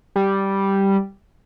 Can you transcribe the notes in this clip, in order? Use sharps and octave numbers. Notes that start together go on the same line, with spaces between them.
G3